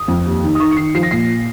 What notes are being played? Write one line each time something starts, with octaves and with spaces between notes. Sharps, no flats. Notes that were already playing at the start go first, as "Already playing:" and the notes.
Already playing: D#6
F2
D#2
D#3
D#6
D#3 C#6
C#7
D#3 C7
F3 C7
A#6
A#2 C7